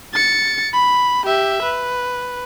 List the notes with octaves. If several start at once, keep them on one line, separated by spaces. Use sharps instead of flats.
A6 C#7
B5
G4 E5
B4